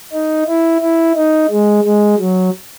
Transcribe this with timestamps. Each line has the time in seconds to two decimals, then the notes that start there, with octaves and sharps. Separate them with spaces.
0.13 D#4
0.48 E4
0.82 E4
1.16 D#4
1.50 G#3
1.84 G#3
2.19 F#3